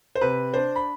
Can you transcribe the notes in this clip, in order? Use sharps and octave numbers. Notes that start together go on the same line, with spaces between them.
C5
C3 B4
D4 C5
B5